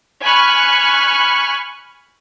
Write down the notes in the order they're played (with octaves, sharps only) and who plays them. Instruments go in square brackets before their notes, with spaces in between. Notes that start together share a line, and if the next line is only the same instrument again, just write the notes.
[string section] G#5 B5 C#6 F6 F#6